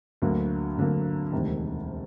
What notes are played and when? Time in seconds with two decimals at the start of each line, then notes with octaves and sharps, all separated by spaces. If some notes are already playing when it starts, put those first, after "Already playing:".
0.22 D2 D3 F#3 A#3
0.77 D2 D3 F#3 A#3
1.32 E1 D2 C3 D#3